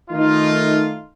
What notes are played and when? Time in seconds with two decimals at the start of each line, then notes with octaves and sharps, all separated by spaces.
0.11 D#3 A3 D#4 F4